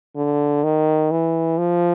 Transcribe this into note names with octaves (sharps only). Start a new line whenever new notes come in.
D3
D#3
E3
F3